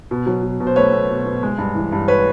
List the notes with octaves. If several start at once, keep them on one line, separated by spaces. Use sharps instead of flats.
B2
F#3
B2
B2
C5
A3 B4 C#5
A3
B2
B2
G#3
G2
E3
G2
B4 C#5